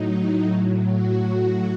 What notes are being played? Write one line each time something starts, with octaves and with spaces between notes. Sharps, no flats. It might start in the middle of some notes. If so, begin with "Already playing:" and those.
Already playing: A2 F#3 D#4
A2 F#3
F#4
A2 F#3